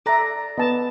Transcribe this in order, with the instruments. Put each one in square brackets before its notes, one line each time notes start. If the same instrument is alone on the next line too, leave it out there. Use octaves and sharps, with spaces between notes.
[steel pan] A4 E5 [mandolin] D5 F#5 A#5
[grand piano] B3 [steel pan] D#5 A5